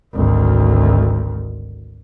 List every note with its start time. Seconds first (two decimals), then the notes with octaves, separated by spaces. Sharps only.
0.14 G#1 D2